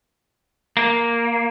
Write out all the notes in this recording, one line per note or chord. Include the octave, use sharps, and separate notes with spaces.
A#3